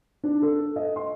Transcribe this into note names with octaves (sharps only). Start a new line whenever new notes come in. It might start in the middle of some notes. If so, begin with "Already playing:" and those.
D4
A4
D#5
C6